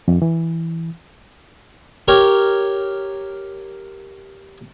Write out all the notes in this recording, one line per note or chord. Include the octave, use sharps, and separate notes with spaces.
F2
E3
G4 A#4 C#5